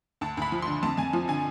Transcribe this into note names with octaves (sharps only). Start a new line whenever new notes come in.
D2 A5
D2 B5
F3
D3 C6
F2 A5
F2 G#5
F3
D3 G#5